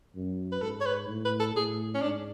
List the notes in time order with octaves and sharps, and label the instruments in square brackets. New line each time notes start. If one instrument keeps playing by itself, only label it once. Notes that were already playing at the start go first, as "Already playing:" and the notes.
[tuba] F#2
[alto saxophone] B4
[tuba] G#2 [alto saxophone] A4
[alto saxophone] C#5
B4
[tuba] A2
[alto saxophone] B4
A4
[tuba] A2 [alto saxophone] G#4
[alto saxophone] C#4
[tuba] G#2 [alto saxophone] D4